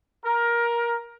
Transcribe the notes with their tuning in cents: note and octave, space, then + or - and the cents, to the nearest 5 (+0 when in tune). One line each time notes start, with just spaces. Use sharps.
A#4 +15